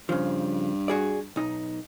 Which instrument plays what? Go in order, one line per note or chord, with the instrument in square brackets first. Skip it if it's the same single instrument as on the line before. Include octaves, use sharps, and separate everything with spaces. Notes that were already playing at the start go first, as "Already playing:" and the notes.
[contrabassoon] G2 [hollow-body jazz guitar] C#3 F3
[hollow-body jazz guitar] F#4 G#4 D5
B1 D#4